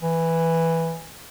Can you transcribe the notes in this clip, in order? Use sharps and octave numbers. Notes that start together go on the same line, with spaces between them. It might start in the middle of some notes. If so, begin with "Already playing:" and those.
E3